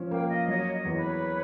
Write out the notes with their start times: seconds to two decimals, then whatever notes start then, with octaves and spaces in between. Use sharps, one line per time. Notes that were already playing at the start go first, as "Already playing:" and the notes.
Already playing: F3 C#4
0.11 A#3 F5 G5
0.29 D#5 F5
0.48 F#3 C#5 D#5
0.73 C#5 D#5
0.85 E2
0.97 B4 C#5